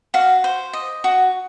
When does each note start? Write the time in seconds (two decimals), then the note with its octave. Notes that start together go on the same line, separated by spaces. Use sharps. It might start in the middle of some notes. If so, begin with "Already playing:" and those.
0.14 F#4 F5
0.44 C5
0.73 D#5
1.04 F#4